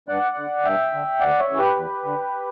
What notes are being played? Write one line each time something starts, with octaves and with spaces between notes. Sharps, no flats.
G2 D5 F#5
D3
G2 E5 G5
D3
D2 D5 F#5
C#5 E5
C#3 E3
G4 B4
E2
D3